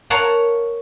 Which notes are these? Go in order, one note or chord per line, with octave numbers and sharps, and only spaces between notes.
A#4 C#5 F5 F#5 A5